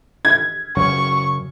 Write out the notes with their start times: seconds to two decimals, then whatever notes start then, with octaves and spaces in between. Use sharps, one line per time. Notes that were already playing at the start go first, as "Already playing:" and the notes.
0.25 G#6
0.77 F#2 C#3 F#3 C#6